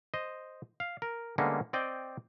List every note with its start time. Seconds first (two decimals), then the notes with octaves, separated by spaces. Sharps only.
0.14 C5 D#5
0.80 F5
1.02 A#4
1.38 D3 G3 G#3 A#3 B3 C#4
1.73 C4 D5 D#5 G5